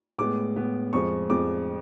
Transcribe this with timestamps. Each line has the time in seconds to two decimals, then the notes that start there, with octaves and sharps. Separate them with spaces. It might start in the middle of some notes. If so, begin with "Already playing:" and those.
0.18 A2 G#3 B3 D6
0.56 A2 G#3 B3
0.93 F2 F3 G#3 C#6
1.30 F2 F3 G#3 D6